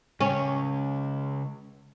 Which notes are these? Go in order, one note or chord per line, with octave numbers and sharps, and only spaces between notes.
C#3 G#3 C#4